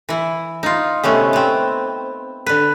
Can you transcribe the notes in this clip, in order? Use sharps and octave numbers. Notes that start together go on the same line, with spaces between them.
E3 E4
D#4 F4
C3 A3 B3 C#4
B3 C4
D3 B4